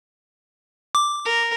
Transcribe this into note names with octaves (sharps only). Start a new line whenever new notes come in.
D6
A#4